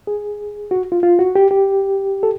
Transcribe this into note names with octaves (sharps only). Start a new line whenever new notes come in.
G#4
F#4
F4
F4
F#4
G4
G4
A4